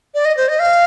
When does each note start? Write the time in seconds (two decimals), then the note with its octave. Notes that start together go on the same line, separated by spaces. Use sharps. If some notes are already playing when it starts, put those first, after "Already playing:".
0.15 D5
0.25 D#5
0.37 C5
0.49 D#5
0.59 F5